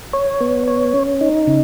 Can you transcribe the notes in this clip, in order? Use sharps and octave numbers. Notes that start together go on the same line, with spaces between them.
C#5
B3
C#5
C#4
D#4
C#3